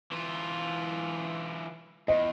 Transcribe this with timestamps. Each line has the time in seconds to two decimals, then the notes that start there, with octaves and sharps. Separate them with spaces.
0.12 E3 F4
2.08 E2 D#5